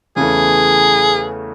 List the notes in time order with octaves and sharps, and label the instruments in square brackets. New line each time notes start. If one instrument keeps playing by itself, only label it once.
[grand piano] E2 C#3 E3 A3 [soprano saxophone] G#4